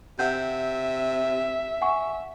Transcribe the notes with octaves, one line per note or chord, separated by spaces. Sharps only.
C3 E5 F#5 G6
F#5 G#5 C#6